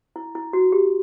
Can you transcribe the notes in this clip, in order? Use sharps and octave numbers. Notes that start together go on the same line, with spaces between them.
E4
E4
F#4
G4